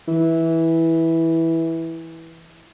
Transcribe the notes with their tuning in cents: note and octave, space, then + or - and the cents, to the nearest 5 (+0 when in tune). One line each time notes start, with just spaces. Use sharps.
E3 -10